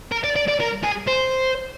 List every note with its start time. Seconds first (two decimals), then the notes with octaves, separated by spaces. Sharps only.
0.12 A#4
0.24 D5
0.36 D5
0.48 D5
0.60 A#4
0.83 G#4
1.08 C5